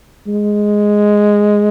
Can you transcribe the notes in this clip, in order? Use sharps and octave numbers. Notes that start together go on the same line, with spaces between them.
G#3